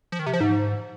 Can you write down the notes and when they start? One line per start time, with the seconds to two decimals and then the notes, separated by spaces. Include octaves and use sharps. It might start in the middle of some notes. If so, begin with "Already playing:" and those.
0.12 F3
0.19 D#3
0.26 C3
0.33 F3
0.41 G#2